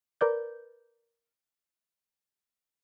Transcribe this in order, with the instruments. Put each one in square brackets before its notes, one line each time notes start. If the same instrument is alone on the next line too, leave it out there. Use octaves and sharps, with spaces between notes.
[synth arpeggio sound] A#4 B4 D5 G6